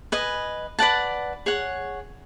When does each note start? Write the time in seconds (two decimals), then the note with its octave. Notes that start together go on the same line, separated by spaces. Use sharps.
0.12 B4 D#5 G#5
0.79 B4 D5 F#5 A5
1.46 G#4 C#5 F#5